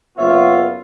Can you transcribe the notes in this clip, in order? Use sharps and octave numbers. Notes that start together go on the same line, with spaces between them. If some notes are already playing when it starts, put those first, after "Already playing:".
F#1 B3 F4 C#5 E5